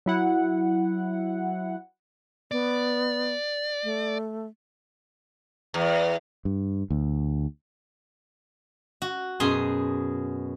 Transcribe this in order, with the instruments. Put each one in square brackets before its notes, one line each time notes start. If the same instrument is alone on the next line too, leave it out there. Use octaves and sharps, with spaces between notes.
[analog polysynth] F#3 E4 F#5
[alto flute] B3 [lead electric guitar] D5
[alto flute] A3
[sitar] E2
[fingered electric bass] G2
D2
[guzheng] F#4
F#2 B2 G#4 G#5 C6